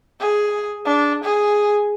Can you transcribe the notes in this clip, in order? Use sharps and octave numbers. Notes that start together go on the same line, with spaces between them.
G#4
D4
G#4